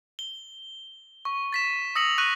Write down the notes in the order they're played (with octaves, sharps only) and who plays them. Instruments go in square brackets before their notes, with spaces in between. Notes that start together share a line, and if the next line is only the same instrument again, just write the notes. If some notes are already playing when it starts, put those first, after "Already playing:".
[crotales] G7
C#6
A6 B6 E7
D#6 E6 A#6 C#7 F#7
C#6 F#6 A#6 D#7